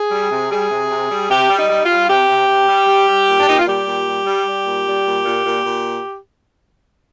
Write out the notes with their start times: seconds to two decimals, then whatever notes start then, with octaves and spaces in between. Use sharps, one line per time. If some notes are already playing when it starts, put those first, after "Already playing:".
Already playing: G#4
0.11 G3
0.31 C3
0.51 G3 G#4
0.70 C3
0.90 C3
1.10 G3
1.30 C3 G4
1.49 G3
1.56 D#4
1.69 G3
1.83 F4
1.89 G3
2.08 C3 G4
2.29 C3
2.48 C3
2.68 G3
2.88 G3
3.08 G3
3.27 A#2
3.40 D4
3.47 A#2 D#4
3.58 F4
3.67 G3 G4
3.87 A#2
4.06 G3
4.26 G3
4.46 G3
4.65 A#2
4.86 G3
5.05 A#2
5.25 A#2
5.44 A#2
5.65 A#2